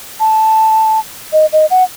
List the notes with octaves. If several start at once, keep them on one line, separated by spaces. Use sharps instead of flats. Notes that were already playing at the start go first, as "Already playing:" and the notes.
A5
D#5
D#5
F#5